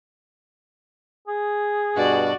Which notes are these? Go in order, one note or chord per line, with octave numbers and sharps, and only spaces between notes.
G#4
G2 B2 F#4 D5